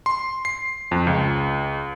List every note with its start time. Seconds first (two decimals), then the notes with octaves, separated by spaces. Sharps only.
0.06 C6
0.45 C7
0.91 F2
1.07 C#2